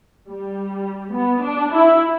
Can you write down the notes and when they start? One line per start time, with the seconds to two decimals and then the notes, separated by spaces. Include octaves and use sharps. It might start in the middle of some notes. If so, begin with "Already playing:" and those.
0.30 G3
1.15 B3
1.43 D4
1.72 E4